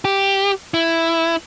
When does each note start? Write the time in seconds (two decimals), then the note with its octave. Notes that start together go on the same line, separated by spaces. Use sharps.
0.05 G4
0.74 E4